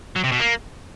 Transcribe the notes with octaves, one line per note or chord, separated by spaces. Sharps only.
F#3
C3
B2
A#3